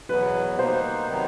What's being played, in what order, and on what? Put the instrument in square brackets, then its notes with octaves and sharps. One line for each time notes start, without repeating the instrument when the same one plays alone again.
[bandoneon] E2 B2 F#3 B3 [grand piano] B4
[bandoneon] B2 G3 A#3 D#4 [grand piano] C5
[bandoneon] C3 D#3 F#3 B3 D#4